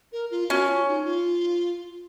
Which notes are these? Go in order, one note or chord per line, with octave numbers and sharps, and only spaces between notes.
A#4
F4
C#4 F#4
F4
D#4
F4